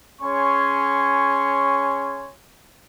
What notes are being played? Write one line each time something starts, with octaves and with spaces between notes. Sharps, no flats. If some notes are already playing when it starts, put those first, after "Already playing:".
C#4 G#4 C#5 G#5 C6 C#6